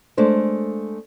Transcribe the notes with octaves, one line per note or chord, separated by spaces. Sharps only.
G#3 A3 D4 C5